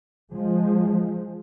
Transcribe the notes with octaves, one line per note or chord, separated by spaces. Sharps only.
F3 G#3